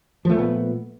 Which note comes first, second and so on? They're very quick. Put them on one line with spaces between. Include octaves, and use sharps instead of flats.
F3 A3 A#2 B3